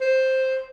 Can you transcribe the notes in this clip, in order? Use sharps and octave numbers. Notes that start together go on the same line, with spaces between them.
C5